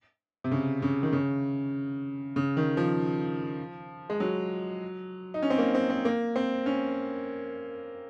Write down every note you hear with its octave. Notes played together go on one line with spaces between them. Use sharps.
C3
C#3
C#3
D#3
C#3
C#3
D#3
F3
G#3
F#3
D#4
C#4
C4
A#3
C4
C4
A#3
C4
C#4